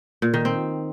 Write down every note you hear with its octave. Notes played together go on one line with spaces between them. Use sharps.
A#2
D#3
C4